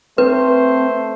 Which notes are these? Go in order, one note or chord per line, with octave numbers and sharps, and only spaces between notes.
A3 C4 B4 C5